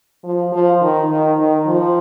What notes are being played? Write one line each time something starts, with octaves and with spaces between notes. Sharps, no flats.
F3
F3
D#3
D#3
D#3
F3